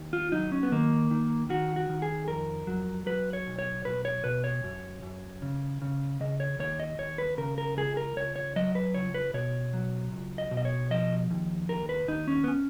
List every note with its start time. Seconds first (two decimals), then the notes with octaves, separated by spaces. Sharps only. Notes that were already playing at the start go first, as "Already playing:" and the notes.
Already playing: D#2
0.13 F4
0.32 F#3 D#4
0.52 C#4
0.63 B3
0.72 D#3 A#3
1.11 D#3
1.49 D#3 F#4
1.76 F#4
1.89 D#3
2.02 G#4
2.28 F2 A#4
2.67 F#3
3.06 F#3 B4
3.33 C#5
3.47 B1
3.59 C#5
3.85 B1 B4
4.05 C#5
4.24 B2 B4
4.44 C#5
4.64 F#2
5.02 F#2
5.42 C#3
5.82 C#3
6.20 C#3 D#5
6.40 C#5
6.59 D#2 C#5
6.80 D#5
6.98 D#2 C#5
7.18 B4
7.37 C#3 A#4
7.58 A#4
7.77 C#2 G#4
7.97 A#4
8.16 C#2 C#5
8.36 C#5
8.56 F#3 D#5
8.75 B4
8.94 C#2 C#5
9.14 B4
9.34 B2 C#5
9.73 F#3
10.12 C#2
10.38 D#5
10.51 B2
10.57 D#5
10.65 C#5
10.91 F3 D#5
11.31 D#2
11.69 D#2 A#4
11.89 B4
12.08 D#2 D#4
12.28 C#4
12.44 B3
12.48 C#4